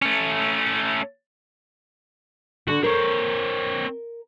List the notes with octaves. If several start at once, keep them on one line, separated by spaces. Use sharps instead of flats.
A3 C#4
D3 F#4 A4
C4 A#4 C#5